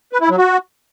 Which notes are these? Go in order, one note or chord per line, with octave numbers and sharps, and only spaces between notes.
B4
E4
F#3
F#4